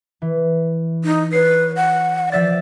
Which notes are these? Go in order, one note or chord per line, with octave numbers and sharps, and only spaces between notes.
E3
D#4
B4 C#5 C7
F#5
F3 D5 E5 A6